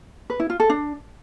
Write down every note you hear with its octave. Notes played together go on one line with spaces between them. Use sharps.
B4
E4
F4
A4
D4